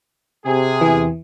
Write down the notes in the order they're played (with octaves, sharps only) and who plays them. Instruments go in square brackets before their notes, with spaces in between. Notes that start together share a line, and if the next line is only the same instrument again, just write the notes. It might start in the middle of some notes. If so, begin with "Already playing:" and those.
[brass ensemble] C3 G#4
[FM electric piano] E2 E3